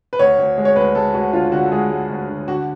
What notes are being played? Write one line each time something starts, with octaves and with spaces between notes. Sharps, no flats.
B4
D2 C#5
D2
G#3
C#5
D2 B4
G#3 A4
D2 F#4
D3 F4
D3 F#4
A4
G#3 G#4
G#3
D2
D3
D3 F#4